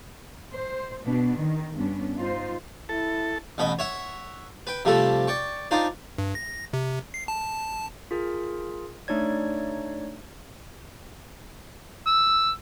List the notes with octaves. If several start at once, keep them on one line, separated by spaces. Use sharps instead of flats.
C5
B2 B3 D4
D#3
G2 B3 C#4 D4
G2 D#4 F4 C5
E4 A4
A1 B2 D#5 B5
C#5 E5 F#5
B4 G5
C3 F3 G3 A3 A4
D5 G5 C#6
D4 D#4 F4 C5 D5
G2
A#6
C3
C7
A5
F4 G#4 A#4
A3 D4 D#4 C#5 D5 G#6
E6